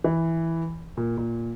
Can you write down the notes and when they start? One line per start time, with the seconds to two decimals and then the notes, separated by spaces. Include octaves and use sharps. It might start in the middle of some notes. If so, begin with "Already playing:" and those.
0.04 E3
0.97 A#2
1.17 A#2